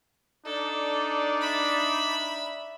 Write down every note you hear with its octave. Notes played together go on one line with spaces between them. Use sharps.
D4 D#4 A4 D5
E5 B5